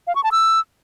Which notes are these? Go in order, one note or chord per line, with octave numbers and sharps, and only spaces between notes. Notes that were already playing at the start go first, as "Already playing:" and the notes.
F5
C#6
A5
E6